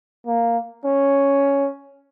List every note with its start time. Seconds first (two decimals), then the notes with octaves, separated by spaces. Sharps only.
0.27 A#3
0.85 C#4